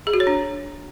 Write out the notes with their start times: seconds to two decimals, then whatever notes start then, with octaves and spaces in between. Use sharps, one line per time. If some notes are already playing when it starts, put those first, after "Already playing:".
0.07 G#4
0.13 F#4
0.20 C#5
0.27 D4